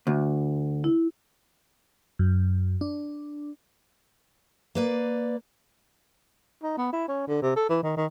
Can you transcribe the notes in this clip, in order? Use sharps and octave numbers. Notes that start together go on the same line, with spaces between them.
D2
E4
F#2
D4
A#3 B4 D5
D#4
B3
E4
C#4
D3
C3
A4
E3
D#3
D#3